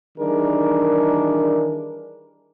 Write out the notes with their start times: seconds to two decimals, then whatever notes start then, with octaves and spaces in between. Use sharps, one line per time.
0.18 D#3 E3 G3 D4 G#4 A#4